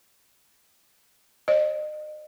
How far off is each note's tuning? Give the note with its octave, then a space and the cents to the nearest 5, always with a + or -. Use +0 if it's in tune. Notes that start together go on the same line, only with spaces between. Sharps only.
C5 +40 D#5 -35